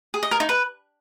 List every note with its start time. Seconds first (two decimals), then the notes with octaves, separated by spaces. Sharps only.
0.14 G#4
0.23 D#5
0.31 A#4
0.40 D#4
0.49 B4